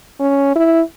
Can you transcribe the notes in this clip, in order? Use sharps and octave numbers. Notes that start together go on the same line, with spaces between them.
C#4
E4